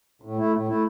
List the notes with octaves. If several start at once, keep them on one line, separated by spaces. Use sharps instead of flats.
A2
A3 E4
A2
A3 E4